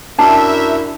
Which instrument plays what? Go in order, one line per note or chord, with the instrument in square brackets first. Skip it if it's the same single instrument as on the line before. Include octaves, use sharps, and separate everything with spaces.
[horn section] F#2 E4 E5 [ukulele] D4 A5